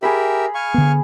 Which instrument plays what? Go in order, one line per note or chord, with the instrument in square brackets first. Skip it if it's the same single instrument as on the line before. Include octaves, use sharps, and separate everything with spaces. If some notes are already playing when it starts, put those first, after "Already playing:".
[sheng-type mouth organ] G4 A#4 E5 [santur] G#4 B5
[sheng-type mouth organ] F5 G#5 C#6
[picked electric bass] D3 B3